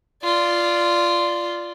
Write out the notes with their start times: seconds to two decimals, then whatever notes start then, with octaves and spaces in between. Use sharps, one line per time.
0.24 F4 D5